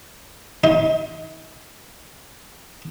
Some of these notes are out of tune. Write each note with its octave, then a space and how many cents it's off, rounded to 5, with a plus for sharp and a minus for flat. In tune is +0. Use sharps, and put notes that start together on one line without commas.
D#4 +35